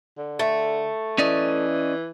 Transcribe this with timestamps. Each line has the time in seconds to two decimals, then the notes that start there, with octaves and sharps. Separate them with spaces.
0.18 D3
0.39 A3
1.18 E3 C#4 D5 D#5